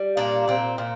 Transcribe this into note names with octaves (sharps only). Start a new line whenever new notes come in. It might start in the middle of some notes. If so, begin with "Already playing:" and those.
Already playing: G3
A#2 A#3 D4
A#2 C4
A#2 C4